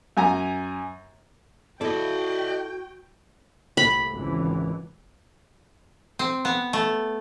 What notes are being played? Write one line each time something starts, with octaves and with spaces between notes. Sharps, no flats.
F#2 G#5 A#5
E4 F#4 A4 D5 D#5 G5
C2 A2 B5
G#1 C#2 E3
C4
B3
A3